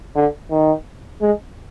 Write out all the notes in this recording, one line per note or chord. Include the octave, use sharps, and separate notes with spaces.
D3
D#3
G#3